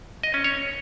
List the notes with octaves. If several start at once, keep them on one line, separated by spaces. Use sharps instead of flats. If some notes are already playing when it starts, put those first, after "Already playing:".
D#5
C#4
C#5